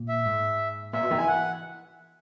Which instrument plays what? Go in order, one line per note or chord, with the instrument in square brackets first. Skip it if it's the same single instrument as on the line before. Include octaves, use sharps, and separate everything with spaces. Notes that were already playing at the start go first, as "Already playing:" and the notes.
Already playing: [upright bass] A#2
[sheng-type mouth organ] E5
[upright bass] G#2
[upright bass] A#2 [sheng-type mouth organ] E5
[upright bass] B2
D#3
[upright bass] E3 [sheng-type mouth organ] G#5
[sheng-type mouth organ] F#5